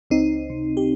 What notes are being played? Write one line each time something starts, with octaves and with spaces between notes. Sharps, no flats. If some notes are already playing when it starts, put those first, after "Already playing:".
C#2 C4 D#4
C3
G4